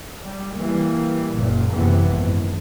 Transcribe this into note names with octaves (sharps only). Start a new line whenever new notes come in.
G3
E3 G3 A#3
F#1 A#2
F#1 C3 E3 B3
G#1 F#2